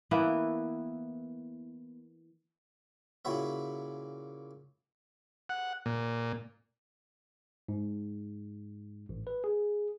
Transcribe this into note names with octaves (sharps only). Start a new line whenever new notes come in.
E3 A#3 B3 E4
A#2 C#3 E4 F#4 C#5 E5
F#5
A#2
G#2
A1
B4
G#4